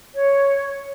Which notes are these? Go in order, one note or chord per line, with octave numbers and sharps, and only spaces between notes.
C#5